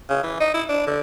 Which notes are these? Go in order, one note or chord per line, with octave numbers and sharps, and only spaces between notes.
C#3
E3
D#4
E4
D4
D3